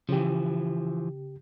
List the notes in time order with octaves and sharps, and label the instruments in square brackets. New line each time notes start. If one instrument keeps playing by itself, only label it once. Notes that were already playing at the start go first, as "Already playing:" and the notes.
[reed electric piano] C#3 G4 [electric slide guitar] E3 F3